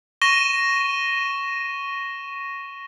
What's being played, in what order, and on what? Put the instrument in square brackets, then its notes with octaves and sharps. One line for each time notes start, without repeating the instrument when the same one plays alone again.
[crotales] C#6 A#6 D#7 E7 G7